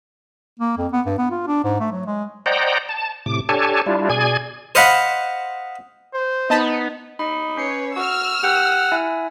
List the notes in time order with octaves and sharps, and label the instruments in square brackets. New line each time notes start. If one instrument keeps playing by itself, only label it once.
[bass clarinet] A#3
F2
B3
G2
B3
F4
D4
G#2
A3
F#3
G#3
[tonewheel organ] C5 D5 D#5 F#5 G5 A#5
A5
A2 C3 D6
D4 G4 A4 C#5 G#5 A5
G3 D4 E4 F4
B2 G#4 D5 G#5 G#6
[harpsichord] C5 D#5 F5 F#5 B5
[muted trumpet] C5
[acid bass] B3 [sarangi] D#4 [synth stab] D#5 A5 B5
[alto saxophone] D#4 [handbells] B5
[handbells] C#4 C7 C#7 [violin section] B4 C#5
[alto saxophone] F#4 [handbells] C#6 [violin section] E6 F6
[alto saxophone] G4 [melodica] F#5
[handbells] E4 E5 G#5